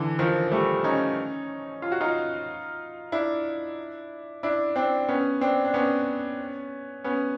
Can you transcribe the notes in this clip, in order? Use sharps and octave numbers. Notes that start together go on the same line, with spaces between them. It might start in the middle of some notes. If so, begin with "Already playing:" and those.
Already playing: D3 E3
D#3 F3
G3 A3
C#4 D#4
F4
F#4
D#4 F4
D4 E4
D4 E4
C4 D4
B3 C#4
C4 D4
D4
B3 C#4
B3 C#4